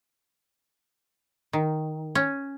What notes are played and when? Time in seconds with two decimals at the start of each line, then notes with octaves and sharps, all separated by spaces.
1.53 D#3
2.15 C#4